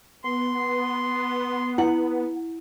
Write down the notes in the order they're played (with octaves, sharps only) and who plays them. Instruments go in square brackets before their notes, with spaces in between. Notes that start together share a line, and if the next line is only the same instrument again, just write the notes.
[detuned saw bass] B3 [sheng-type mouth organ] C6
[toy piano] E4 [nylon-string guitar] F#5